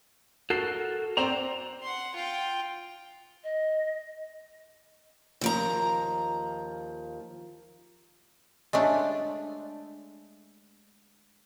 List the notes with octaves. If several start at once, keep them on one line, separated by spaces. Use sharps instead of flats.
F#4 A4 A#4 C7
C4 C5 D5 A#5 F7
F#5 C6
F4 G5
D#5
D#2 F3 A#5
G#3 A3 D4 G4 C#5 D#5